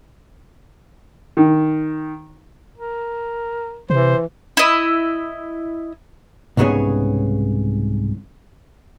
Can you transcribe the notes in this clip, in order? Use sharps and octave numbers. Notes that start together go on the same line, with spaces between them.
D#3
A#4
C3 E3 C5
E4 D#5
C2 G#2 C#3 B3 G#4 C#5